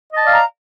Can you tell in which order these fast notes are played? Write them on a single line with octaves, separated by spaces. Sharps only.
D#5 A5 D5 F5 A#5